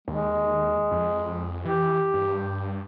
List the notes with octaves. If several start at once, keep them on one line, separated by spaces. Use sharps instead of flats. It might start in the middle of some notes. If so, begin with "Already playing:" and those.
D#2 G#3
F2
E3 G4
G2